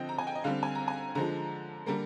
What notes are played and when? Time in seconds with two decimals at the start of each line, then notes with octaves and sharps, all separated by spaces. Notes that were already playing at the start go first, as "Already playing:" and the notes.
Already playing: D3 F3 C4 D#5 G5
0.09 A#5
0.18 G#5
0.27 G5
0.35 D#5
0.44 D3 G3 C4 F5
0.63 G#5
0.75 A#5
0.88 G#5
1.15 D3 F3 G#3 A#5
1.86 D3 G3 A#3 A#5